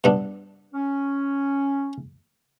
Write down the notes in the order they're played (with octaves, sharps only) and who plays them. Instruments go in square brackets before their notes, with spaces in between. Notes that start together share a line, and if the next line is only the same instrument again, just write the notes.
[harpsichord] G2 B3 D4
[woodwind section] C#4